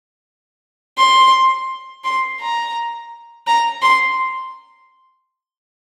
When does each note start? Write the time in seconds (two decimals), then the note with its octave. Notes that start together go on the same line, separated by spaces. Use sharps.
0.98 C6
2.04 C6
2.41 A#5
3.47 A#5
3.82 C6